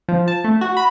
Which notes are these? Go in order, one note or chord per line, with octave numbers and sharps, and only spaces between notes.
F3
A5
A3
F#4
B5